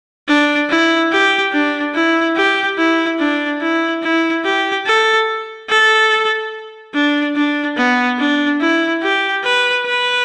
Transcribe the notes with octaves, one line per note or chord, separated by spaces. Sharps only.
D4
E4
G4
D4
E4
G4
E4
D4
E4
E4
G4
A4
A4
D4
D4
B3
D4
E4
G4
B4
B4